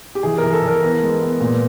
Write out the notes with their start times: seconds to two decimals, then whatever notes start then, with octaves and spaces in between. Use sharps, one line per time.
0.15 G4
0.23 E3 G#4
0.38 E3 A#4
0.53 A4
0.62 E3
0.68 A#4
0.83 B3
1.02 G#3
1.21 B3
1.41 A#2